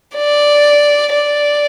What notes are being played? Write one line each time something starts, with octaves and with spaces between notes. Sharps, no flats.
D5
D5